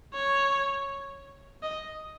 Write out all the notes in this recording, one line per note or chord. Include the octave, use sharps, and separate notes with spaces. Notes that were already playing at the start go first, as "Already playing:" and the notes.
C#5
D#5